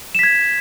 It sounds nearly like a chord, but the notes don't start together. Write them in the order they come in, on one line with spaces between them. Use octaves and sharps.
E7 B6 G#6